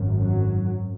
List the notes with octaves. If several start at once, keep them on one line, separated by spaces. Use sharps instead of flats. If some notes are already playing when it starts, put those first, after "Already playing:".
Already playing: G#1 F#2
F#3